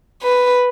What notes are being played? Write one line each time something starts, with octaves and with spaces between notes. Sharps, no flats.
B4